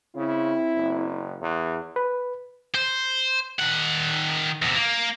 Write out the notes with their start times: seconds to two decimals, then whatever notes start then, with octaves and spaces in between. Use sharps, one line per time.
0.16 C#3 C4 E4
0.75 F#1
1.41 E2
1.96 B4
2.75 C5
3.60 D#3 F#5
4.62 E2 C3
4.75 A#3